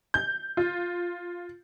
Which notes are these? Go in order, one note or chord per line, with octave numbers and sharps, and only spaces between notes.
G6
F4